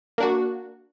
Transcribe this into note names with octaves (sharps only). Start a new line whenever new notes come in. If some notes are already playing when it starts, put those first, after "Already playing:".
A#3 D4 F#4